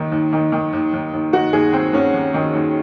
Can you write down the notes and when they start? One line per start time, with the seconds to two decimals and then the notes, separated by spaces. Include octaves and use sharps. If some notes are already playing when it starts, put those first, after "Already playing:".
Already playing: D#2 D#3
0.12 D#2
0.33 D#3
0.52 D#3
0.73 D#2
0.93 D#2
1.13 D#2
1.33 D#3 F#4
1.53 D#2 G#4
1.73 D#2 C4
1.93 D#2 C#4
2.14 D#2
2.34 D#3
2.54 D#2